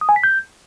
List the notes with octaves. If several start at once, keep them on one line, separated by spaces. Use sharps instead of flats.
D#6
G#5
B6
G6